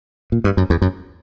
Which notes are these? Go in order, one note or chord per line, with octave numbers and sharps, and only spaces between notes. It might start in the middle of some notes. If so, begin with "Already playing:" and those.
A#2
G2
F#2
E2
F#2